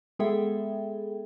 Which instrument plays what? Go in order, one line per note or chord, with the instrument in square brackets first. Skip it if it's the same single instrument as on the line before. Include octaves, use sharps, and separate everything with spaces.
[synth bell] G#3 B3 G#4 A4 E5 G5